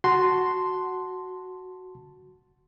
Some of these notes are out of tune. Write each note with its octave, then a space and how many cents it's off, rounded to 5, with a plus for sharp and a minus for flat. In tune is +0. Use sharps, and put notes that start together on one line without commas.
F#4 +0 A5 +0 C6 -5